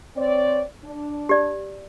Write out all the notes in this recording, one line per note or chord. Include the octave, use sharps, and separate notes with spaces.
C4 C#5 D5
D4
G4 D5